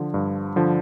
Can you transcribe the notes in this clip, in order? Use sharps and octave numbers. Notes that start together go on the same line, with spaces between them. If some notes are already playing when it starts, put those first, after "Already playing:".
Already playing: D3 F3
G2
D3 F3